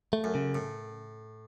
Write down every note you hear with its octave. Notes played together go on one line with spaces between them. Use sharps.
A3
F#2
C#3
A2